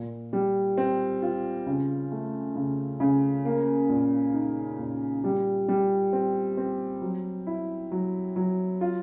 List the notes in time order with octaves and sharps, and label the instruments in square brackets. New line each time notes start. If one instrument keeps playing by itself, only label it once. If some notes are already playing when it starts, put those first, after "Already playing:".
Already playing: [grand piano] A#2
G3
C4
F4
C#3
A3
C#3
C#3
A#3
A#2
D#4
A#2
G3
G3
C4
C4
F#3
E4
F#3
F#3
F4